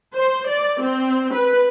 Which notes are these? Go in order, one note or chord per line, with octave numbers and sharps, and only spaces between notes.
C5
D5
C4
B4